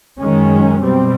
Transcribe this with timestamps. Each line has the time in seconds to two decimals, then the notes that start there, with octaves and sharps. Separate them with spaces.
0.20 F#2 D#3 G#3 C#4
0.81 B2 G3 C4